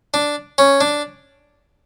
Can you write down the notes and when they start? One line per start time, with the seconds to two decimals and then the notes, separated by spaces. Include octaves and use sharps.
0.14 D4
0.58 C#4
0.81 D4